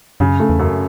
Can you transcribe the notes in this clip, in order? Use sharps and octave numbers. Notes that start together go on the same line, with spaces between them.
F#2 C#3
A3
E2
F#2